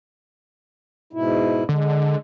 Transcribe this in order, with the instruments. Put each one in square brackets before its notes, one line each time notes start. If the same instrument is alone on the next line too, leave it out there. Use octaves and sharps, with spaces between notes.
[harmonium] G#2 B2 E4
[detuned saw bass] D3 [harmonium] G#3